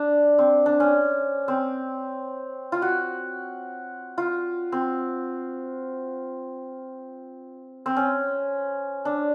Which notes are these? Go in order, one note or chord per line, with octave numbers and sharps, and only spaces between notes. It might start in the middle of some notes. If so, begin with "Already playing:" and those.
Already playing: D4
C4
D4
C#4
C4
F4
F#4
F4
C4
C4
C#4
D4